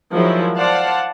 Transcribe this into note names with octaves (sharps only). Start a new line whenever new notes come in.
D#3 F3 F#3 G#3 E4
C5 D5 F5 F#5 A5